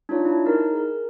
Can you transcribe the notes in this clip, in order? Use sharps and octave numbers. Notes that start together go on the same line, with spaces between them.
D4 D#4 F4 C#5
E4 A5
D#4 A#4
G#4 A#4